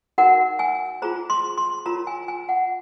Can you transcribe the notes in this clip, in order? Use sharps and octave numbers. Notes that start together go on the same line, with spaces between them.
D#4 F#4 A#4 F#5
G#5
F4 G#4 C5 A#5
C6
C6
F4 A#4 C#5 A#5
G#5
G#5
F#5